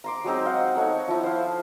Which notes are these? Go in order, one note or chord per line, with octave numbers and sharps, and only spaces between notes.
A#5 C6 D6
F#3 G#3 C4 D#4
D#5 F5 F#5
D#4 A4 C#5 F#5
F3 E4
C5 F5